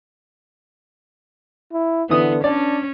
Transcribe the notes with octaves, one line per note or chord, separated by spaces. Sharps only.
E4
D3 E3 B3 D#6
C#4 D4 D5